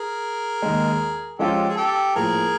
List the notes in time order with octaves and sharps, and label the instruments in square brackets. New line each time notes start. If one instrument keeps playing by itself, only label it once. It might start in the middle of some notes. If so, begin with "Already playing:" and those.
Already playing: [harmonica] G#4 A#4
[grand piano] D#2 D#3 G#3
[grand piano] F3 G#3 C#4 F4 [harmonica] G4 A4
[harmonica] G#4
G4 A4
[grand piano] A2 F3 A#3 [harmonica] G#4 A#4